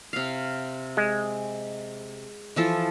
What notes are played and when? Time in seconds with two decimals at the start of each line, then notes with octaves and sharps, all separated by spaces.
0.13 C3 F5
0.97 G#3
2.56 E3 F3 A4